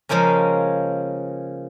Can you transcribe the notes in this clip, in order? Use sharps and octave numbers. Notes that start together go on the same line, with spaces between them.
C#3 F3 G#3 A#3 C#4